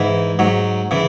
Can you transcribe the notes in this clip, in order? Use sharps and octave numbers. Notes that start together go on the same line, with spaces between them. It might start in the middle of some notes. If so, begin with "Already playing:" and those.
Already playing: G#2 E3
G#2 F#3
C#3 E3